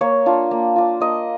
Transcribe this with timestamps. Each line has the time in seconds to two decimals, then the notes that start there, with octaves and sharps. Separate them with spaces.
0.01 A#3 C#5
0.26 D4 F4
0.51 A#3
0.76 D4 F4
1.00 A#3 D#5